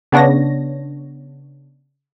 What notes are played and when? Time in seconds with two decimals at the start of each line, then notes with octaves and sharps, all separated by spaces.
0.12 C#3 B3 D4 C#5 A#6